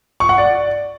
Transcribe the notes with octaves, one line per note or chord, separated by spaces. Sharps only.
C#6
F#5
D5